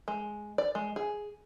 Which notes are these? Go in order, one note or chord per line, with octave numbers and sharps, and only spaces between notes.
G#3
D5
G#3
G#4